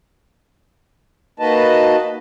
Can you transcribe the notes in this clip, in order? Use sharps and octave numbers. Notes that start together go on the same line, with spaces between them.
A#3 D#4 F#4 B4 D#5 A5